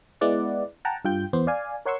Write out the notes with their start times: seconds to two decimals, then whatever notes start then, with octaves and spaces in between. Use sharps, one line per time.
0.21 G#3 B3 E4 D5 F#5
0.85 F#5 G5 A5 A#5
1.05 G2 F4 G5 G6
1.33 E2 B3 C5
1.47 D5 F5 G#5
1.86 A#4 C#5 F#5 C6 C#6 E6